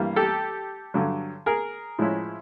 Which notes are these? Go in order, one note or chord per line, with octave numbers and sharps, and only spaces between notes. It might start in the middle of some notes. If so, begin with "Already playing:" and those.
Already playing: G2 E3 G3 A#3
G4 A4
G2 D3 F#3
G#4 A#4
A2 F3 G#3 C#4 E4